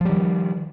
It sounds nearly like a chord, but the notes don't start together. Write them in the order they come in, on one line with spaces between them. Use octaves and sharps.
F3 G3 D#3